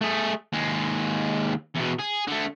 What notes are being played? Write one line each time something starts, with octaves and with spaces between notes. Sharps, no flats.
A3 G#4
D#2 G#3
E2 B2
G#4
D3 A3